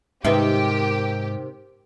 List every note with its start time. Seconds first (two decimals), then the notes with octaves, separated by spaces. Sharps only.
0.25 G#2 C3 D#3 D#4 G4 B4 E5